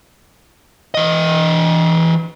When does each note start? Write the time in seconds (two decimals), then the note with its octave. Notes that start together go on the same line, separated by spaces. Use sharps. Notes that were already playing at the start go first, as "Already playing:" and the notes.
0.94 E3 D#5